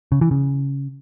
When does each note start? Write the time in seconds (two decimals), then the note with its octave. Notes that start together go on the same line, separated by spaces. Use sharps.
0.12 C#3
0.21 E3
0.31 C#3